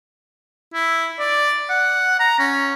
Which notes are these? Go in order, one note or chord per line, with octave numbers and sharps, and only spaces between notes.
E4
D5
F#5
A#5
C#4